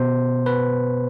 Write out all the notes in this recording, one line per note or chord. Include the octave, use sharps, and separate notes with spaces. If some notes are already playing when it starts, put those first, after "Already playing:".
Already playing: B2 B3 C5
B4